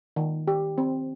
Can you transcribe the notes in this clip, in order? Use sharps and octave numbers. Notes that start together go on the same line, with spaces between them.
D#3
G4
C4